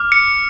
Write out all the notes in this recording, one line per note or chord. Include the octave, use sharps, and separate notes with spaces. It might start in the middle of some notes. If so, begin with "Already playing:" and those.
Already playing: D6 F6
C#7